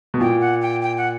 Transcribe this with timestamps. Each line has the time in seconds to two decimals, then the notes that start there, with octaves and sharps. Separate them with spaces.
0.14 B2
0.20 A#2 G5
0.41 F#5
0.62 G5
0.82 G5
0.98 F#5